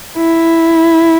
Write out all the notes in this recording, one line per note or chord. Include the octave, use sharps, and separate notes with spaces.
E4